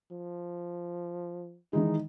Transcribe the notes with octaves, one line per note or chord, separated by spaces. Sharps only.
F3
D#3 E3 G#3 D#4